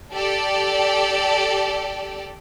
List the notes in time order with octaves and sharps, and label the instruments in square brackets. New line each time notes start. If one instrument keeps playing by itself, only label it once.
[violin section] G4 A4 D5